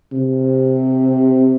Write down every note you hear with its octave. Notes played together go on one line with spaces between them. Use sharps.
C3